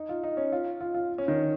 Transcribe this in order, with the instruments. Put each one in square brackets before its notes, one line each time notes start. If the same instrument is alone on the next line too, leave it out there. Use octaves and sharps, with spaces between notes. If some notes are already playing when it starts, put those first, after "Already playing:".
Already playing: [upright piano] D#4
F4
D#4
C#4
F4
F4
F4
C#4
D#3